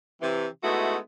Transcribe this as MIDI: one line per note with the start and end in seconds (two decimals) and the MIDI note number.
0.22 0.47 48
0.22 0.47 52
0.64 0.98 56
0.64 0.98 57
0.64 0.98 59
0.64 0.98 63
0.64 0.98 64
0.64 0.98 66